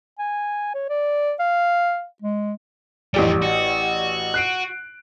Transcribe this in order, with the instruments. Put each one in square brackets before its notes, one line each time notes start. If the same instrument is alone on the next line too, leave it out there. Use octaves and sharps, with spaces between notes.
[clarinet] G#5
C#5
D5
F5
G#3
[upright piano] A1 G4 D5 [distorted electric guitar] F2 G3
[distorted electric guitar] F#4
[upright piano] F#6 C7 D7